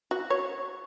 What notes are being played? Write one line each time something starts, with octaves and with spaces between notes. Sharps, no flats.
F#4
C#5